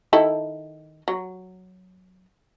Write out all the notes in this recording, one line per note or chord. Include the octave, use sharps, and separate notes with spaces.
D#3 E4 A4
F#3